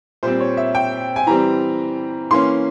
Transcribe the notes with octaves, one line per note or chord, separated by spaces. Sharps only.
A#2 G3 C4 C5
C#5
E5
G5
G#5
E3 G3 C4 A#5
E3 A#3 C#4 C6